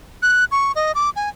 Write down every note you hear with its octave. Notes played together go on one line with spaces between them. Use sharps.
F#6
C#6
D#5
D6
G#5